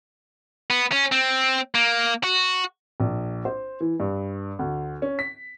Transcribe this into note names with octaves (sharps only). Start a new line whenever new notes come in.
B3
C#4
C4
A#3
F#4
A#1
C5
E3
G2
D2
C#4
B6